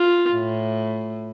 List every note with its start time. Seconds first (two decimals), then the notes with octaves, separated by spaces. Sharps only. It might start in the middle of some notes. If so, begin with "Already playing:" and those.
Already playing: F4
0.32 A2